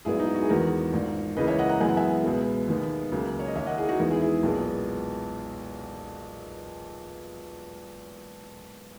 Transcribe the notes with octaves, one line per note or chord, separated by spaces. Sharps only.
A#1 G#2 F#3 B3 E4 G#4
D#4
E4
F#4
G#4
E2 D#3 G#3 B3 F#4 A#4
A#1 G#2 D#3
C#2 C#3 E3 A#3 B4 D#5
C#5 E5
D#5 F#5
F#5 A#5
F#2 E3 G#3 B3 G#5
F#5
E5 G#5
C#2 B2 G#3 B3
D#2 D#3 G#3 B3
C#2 C#3 F#3 A#3
C#5
D#5
D#2 D#3 A#3 C#5 E5
D#5 F#5
E4 G#4
D#4 F#4
E2 D#3 G#3 B3 E4 G#4
E4 G#4
E4 G#4
B1 A#2 G#3 B3